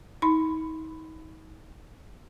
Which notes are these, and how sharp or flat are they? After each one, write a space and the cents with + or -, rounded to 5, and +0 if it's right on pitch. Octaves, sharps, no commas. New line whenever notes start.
D#4 +35 B5 +15